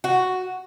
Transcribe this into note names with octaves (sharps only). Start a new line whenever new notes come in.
F#4